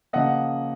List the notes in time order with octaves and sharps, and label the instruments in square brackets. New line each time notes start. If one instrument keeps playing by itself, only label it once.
[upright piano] C#3 F3 A#3 D#5 F#5